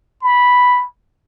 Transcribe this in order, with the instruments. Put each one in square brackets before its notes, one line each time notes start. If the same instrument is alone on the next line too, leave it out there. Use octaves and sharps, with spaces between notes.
[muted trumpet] B5